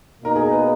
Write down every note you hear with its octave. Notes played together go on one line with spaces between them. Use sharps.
B2 A#3 D#4 A#4
G#4
B4